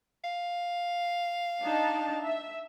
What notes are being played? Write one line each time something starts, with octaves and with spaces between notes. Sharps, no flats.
F5
D4 D#4 A5
E5